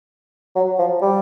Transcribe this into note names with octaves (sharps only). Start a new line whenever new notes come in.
F#3
F3
G3